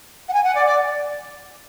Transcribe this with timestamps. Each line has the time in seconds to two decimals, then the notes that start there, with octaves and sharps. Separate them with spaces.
0.28 F#5
0.33 G#5
0.44 F#5
0.55 D5
0.66 D5